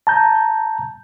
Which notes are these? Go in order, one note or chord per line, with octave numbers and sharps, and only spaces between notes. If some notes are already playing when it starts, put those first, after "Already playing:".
A5 A#5 G6